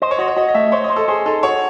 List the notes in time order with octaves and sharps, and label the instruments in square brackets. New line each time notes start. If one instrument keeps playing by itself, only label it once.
[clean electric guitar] C5 [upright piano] D#5
[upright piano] C#5
[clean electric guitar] F#4 [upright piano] D#5
[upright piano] C#5
[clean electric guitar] F#4 [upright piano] D#5
[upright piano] D#5
[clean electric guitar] A3 [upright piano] E5
[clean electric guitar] C5 [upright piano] C#5
[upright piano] D#5
[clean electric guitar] C5
[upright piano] A4
[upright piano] G#4 [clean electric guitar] C5
[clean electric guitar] D#4 [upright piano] A4
[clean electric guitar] F#4 [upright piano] C#5